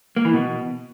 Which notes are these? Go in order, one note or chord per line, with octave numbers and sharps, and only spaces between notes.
A#3
E3
B2